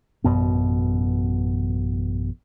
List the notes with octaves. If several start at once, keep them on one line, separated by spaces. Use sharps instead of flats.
A1 F#2 B2 B3